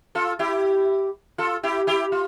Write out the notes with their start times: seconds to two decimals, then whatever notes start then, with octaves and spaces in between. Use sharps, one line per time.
0.15 F4 A4
0.39 E4 G4
1.38 F4 A4
1.63 E4 G4
1.87 E4 G4
2.12 F4